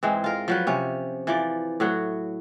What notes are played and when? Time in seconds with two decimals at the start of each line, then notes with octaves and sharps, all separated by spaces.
0.03 G#2 E3 G#3 C4
0.24 F4 A#4
0.48 F3 F#3 B4
0.67 C3 C#4
1.27 E3 F3 D5
1.80 A2 F#3 F#4